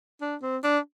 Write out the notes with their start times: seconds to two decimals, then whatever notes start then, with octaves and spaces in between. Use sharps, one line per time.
0.21 D4
0.42 C4
0.64 D4